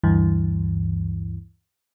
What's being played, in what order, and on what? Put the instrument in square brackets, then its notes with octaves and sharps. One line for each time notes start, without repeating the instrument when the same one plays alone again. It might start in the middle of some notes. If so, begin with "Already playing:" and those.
[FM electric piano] D2 G2 E3